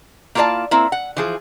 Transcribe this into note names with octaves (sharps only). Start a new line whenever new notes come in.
A#3 E4 F4 A4 D5 A5
A#3 C4 E4
F#5
E3 F3 G#4